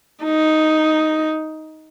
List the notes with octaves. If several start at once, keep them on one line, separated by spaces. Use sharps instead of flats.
D#4